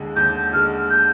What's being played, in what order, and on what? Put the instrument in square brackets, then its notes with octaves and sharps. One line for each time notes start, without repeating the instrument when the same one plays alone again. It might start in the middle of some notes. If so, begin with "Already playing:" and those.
Already playing: [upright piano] D#2 D3 G#3
[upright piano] D#2 [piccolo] G6
[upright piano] D3 G#3 [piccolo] F6
[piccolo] G6